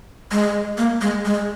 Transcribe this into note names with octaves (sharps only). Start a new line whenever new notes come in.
G#3
A#3
G#3
G#3